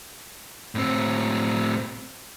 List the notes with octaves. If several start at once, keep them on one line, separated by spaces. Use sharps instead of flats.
A2 C4